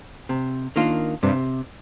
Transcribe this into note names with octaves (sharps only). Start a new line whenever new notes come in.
C3
D#3 A#3 D4 F4
G2 C3